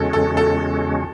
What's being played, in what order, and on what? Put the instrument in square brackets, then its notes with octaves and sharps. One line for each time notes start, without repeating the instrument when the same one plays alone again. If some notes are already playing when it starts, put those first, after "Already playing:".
Already playing: [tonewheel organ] E2 C#3 G#3 C#4 F#4 [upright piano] A4
[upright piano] A4
A4